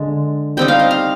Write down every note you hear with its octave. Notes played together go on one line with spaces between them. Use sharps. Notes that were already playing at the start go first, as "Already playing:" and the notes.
Already playing: D3 G#3
G3 C4 D#4 G5
F5
D#5
F5